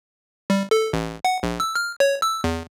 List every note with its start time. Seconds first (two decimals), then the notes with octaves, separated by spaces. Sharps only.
0.50 G3
0.71 A4
0.93 A1
1.25 F#5
1.43 A#1
1.60 E6
1.75 F6
2.00 C#5
2.22 E6
2.44 E2